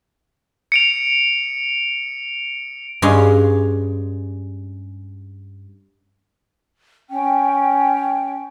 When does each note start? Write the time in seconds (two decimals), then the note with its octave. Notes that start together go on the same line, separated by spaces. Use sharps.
0.72 C#7 D7 F7
3.02 G2 G#3 C#4 F5 C6
7.10 C#4 G5